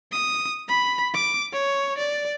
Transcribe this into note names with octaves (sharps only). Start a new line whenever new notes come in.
D#6
B5
D6
C#5
D5